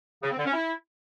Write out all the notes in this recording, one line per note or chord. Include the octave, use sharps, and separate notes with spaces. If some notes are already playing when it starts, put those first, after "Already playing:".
C#3
C4
D3
C#4
E4